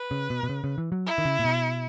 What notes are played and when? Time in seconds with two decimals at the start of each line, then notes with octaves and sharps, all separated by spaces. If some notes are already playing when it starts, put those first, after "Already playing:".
Already playing: B4
0.11 C#3
0.30 B2
0.43 B2
0.49 C#3
0.64 C#3
0.78 E3
0.92 F#3
1.06 E4
1.18 D#3
1.25 C#3
1.39 A#2
1.45 B2